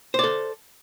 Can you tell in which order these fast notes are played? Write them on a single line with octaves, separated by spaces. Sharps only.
C5 D5 A4